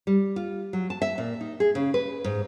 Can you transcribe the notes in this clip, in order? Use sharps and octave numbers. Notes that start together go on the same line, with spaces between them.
G3
F4
F#3
A5
E5
A#2
D#4
G#4
C#3
B4
G#2